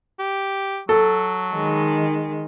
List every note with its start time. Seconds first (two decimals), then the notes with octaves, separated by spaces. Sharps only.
0.19 G4
0.89 F#3 A4
1.54 D#3 G#3